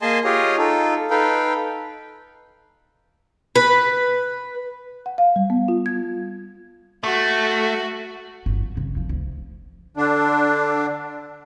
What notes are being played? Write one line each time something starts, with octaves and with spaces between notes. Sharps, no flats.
A#3 G#4 D#5 G#5 A5 C6
F4 G4 G#4 C#5 D#5 F5
D#4 F4 A4
D#4 A4 B4 F5 G5
B4
F#5
F5
G3
B3
F4
G#6
A3 F#4
G1
F3
C#3
F3
D2
D3 D4